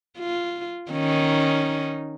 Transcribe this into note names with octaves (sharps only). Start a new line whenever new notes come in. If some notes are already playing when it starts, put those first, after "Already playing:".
F4
D#3 C#4 D#4